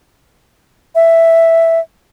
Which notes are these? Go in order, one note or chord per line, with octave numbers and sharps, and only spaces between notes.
E5